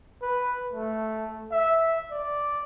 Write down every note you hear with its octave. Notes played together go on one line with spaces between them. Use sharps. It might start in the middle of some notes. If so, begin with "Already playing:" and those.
B4
A3
E5
D5